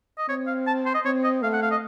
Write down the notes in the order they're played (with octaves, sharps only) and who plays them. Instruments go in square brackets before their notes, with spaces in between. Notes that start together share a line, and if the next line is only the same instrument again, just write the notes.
[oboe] D#5
[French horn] C4 [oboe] C#5
[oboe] F5
A5
C5
D#5
[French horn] C4 [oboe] C#5
[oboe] D#5
[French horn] A3 [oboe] F5
[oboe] F#5
F5
D#5